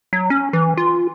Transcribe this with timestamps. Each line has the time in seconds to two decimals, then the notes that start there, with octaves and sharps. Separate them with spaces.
0.13 F#3
0.30 C#4
0.53 E3
0.77 F4